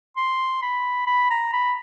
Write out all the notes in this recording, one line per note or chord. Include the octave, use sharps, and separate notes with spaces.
C6
B5
B5
A#5
B5